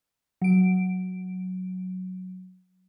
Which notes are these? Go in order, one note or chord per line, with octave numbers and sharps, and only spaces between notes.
F#3 D7